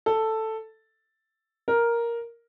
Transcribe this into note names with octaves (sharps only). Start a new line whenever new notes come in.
A4
A#4